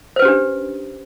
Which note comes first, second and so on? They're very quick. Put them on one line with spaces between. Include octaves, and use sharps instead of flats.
C5 B4 C#4 G4 D4